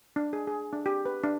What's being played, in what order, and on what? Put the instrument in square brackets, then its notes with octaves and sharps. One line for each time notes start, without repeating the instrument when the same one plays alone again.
[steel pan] D4
G#4
G#4
D4
G4
B4
D4